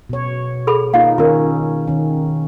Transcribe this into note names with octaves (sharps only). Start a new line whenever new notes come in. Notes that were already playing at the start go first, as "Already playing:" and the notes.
B2 C#5
G#4 A4 B5
A#3 D#4 F4 D#5 F5
D#3 C#4 F4 G#4 A#4
D#3 C#4